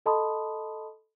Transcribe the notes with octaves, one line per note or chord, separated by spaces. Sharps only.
A4 D#5 A5 B5 C6 D#6